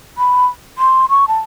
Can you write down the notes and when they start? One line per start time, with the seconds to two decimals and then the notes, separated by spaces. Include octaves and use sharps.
0.18 B5
0.78 C6
1.09 C#6
1.28 A5